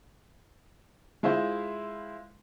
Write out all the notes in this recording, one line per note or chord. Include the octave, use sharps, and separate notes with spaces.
G#3 E4 F4 C5